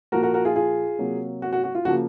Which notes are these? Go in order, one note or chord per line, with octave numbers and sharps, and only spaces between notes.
A#2 F3 A#3 F#4 A#4
F#4 A#4
F#4 A#4
F4 G#4
F4 G#4
C3 F#3 A#3
F#4
F#4
F#4
F4
C#3 F3 A#3 F#4